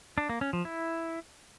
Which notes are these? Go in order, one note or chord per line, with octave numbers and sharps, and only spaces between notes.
D4
A#3
C#4
F3
E4